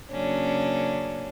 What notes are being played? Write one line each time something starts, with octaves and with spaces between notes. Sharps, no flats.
C#3 F#3 A#3 C#4 D4